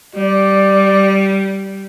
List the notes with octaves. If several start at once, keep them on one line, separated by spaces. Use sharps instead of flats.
G3 D5